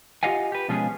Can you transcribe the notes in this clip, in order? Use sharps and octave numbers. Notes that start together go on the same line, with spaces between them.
F4 G4 D#5 F5 F#5 G#5
G4 B4
B2 F3 G#3 C#4 F4 G#4